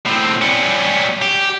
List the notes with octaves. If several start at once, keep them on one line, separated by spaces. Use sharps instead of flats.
A2 C4
G3 C#4
G4